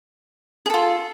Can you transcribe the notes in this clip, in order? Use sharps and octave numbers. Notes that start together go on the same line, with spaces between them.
F4 G#4 A4